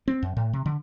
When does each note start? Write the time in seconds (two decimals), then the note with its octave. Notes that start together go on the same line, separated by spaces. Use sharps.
0.08 C4
0.23 F#2
0.37 A2
0.53 C3
0.66 D3